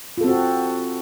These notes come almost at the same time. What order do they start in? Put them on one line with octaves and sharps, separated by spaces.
F4 A4 C4 F#4